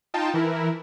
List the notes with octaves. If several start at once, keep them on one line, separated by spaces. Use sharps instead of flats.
D#4 F4 G5 A5
E3 E4 A#4